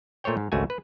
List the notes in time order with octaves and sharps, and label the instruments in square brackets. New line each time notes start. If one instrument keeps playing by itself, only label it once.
[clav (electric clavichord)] A#2 A3 C5 C#5 G5
G#2
G#1 C#2 A3 F#4 G#5
B4